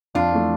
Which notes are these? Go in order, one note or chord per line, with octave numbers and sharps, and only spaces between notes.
F2 D4 F4
E3 A3